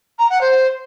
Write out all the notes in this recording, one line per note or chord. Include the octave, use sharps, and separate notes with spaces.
A#5
F#5
C5